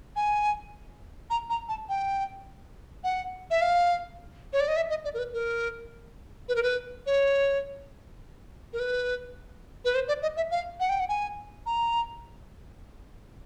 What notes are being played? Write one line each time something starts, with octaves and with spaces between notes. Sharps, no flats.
G#5
A#5
A#5
A5
G5
F#5
E5
F5
C#5
D5
D#5
E5
D#5
D5
A#4
B4
A#4
B4
A#4
B4
C#5
A#4
B4
B4
C5
D5
D#5
E5
F5
F#5
G5
F#5
G#5
A#5